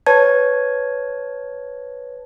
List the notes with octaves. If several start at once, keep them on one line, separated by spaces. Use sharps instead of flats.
B4 C#5 A5 G#6